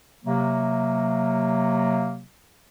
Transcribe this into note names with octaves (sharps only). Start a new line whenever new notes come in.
C3 F#3 A#3